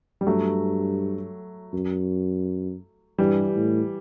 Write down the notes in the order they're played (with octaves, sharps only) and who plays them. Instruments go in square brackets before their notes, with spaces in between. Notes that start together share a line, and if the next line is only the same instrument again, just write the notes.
[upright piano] G3
[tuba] G2 [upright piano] F#3 A3
[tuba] F#2
[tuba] G2 [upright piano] E3 G3
[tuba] A2